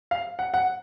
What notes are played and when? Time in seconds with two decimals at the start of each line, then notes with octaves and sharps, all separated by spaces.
0.11 F5
0.39 F#5
0.54 F#5